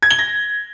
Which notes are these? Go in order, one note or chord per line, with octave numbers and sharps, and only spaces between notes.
G#6
G7
A#6